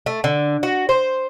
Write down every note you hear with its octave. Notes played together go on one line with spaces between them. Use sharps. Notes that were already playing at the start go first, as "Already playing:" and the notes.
A3
D3
F#4
C5